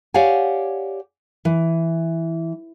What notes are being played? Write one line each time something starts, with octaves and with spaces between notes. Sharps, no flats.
G4 C#5 D5 F5 F#5 G#5
E3